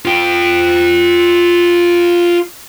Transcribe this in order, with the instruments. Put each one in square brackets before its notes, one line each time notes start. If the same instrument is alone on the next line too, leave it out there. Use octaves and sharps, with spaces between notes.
[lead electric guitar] F4 G5